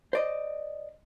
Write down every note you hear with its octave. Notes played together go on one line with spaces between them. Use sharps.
C5 D5 D#5